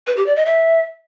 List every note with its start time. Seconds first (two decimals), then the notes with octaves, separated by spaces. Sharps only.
0.07 B4
0.17 G4
0.26 D5
0.36 D#5
0.46 E5